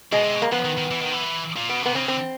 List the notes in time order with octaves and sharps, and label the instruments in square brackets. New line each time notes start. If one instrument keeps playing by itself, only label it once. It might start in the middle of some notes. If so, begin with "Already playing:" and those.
[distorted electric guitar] B2 [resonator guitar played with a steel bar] G#3
[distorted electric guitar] C3
B2
[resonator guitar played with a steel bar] A#3
[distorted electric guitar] F3 [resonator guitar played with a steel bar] B3
[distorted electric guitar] D#3
D#3
E3
D#3
E3
A#2
[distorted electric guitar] B2 [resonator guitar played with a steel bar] B3
[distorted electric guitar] C3 [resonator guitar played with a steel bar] B3
[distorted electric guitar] C#3 [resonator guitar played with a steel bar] C4
[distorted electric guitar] D3 [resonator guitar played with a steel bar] C4